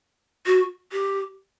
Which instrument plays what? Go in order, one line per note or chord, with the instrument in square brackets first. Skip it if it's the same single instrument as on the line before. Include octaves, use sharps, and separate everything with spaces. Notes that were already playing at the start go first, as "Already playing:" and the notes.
[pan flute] F#4
G4